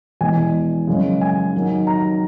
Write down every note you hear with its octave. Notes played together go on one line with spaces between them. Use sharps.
E2 B2 G#3 G#5
F#2 C#3 G#3
G#5
G#2 D#3 F#3
A#5